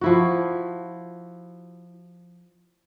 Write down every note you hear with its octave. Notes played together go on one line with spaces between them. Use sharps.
F3 E4 F#4